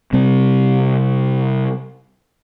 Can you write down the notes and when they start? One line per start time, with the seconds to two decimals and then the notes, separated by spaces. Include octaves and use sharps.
0.13 C3 G3 C4